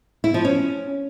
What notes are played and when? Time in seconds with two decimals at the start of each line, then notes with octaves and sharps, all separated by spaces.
0.24 E4
0.34 F3
0.45 C#4